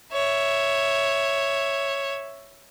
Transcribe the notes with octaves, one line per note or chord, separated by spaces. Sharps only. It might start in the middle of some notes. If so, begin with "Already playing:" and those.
C#5 E5